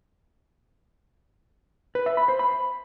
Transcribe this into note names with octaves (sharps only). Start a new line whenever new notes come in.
B4
E5
B5
C5
B5